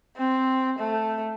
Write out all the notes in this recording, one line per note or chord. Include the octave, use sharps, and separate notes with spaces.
C4
A3